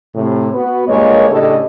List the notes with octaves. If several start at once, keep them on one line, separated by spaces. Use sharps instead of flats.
A2 C3
B3 F#4 B4
G2 A#2 G#3 A#3 C#5 D#5
A2 C#3 D4 G4 A4 D#5